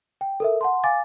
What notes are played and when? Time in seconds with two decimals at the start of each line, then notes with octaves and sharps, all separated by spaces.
0.21 G5
0.40 A4 A#4 E5
0.61 F#5 A5 C6
0.84 F5 G#5 D6 A6